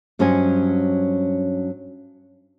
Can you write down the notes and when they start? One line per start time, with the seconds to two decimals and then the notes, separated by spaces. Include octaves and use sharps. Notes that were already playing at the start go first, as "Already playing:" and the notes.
0.19 G2 F#3 C#4 C5 D#5 G#5